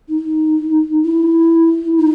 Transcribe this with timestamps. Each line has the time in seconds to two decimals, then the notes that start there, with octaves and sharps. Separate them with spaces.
0.09 D#4
1.03 E4
1.98 D#4